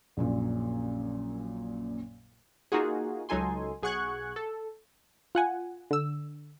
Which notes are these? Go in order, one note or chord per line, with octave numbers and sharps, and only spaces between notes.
A#1 F#2 A#2
A#3 D#4 F4 F#4 G#4
C#2 F#3 D#4 A4 G#5 C6
B1 G#4 F#5 C#6 F#6 G#6
A4
F4 F#5 G#5
D3 E6